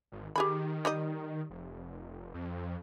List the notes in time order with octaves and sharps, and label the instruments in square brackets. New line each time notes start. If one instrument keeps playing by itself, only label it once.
[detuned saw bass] G#1
[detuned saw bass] D#3 [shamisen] G4 G#4 B5
[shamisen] G3 D#4 D#5
[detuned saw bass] F1
F2